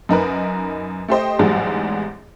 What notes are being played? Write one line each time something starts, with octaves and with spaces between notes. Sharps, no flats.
F#2 D#4 A#4 B4
A3 G4 C5 D#5
A1 E2 G#2 F#3 G3